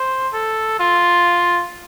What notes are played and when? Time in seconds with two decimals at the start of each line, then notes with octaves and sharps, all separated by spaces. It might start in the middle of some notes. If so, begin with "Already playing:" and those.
Already playing: C5
0.33 A4
0.79 F4